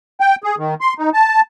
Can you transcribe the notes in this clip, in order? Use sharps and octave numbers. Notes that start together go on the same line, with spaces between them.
G5
G#4
D#3
C6
D#4
A5